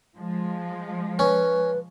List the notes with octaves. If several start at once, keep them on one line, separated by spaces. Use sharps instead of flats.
F3 G#3
C#4 B4